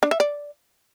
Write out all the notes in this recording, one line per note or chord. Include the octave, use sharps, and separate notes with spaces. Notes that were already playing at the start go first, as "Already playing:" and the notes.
D4
E5
D5